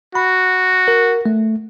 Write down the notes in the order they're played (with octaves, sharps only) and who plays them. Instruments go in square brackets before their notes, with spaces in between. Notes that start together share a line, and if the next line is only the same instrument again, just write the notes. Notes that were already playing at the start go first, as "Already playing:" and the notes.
[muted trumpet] F#4 [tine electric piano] B5
[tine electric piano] A#4
A3